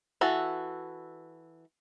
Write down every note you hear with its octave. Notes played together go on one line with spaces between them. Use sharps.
E3 F#4 A4